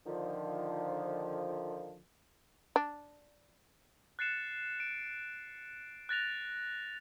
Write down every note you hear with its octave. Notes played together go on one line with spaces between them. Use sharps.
D3 D#3 F3
D4
F#6 A6 C7 C#7 E7
D7
F#6 A6 A#6 F7